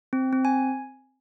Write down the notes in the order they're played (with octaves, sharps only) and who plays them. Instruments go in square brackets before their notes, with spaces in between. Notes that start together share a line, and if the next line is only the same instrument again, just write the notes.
[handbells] C4
C4
G#5